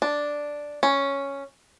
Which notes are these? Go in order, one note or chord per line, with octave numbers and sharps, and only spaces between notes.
D4
C#4